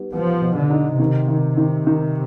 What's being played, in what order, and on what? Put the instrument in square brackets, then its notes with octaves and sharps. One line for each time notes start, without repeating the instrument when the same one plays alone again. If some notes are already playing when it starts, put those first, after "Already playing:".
Already playing: [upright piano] G3 B3 D#4
[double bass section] F3 [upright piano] B3
[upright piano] B2
[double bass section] D3
[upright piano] D#4
[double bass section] C3 [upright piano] D#3
[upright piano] D#3
D#3
D#3